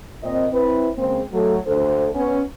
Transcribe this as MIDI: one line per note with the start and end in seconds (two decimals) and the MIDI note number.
0.22 0.47 46
0.22 0.47 60
0.22 0.47 75
0.52 0.89 60
0.52 0.89 64
0.52 0.89 71
0.97 1.21 49
0.97 1.21 56
0.97 1.21 58
0.97 1.21 60
1.32 1.56 54
1.32 1.56 57
1.32 1.56 69
1.66 2.09 38
1.66 2.09 69
1.66 2.09 72
2.15 2.41 59
2.15 2.41 61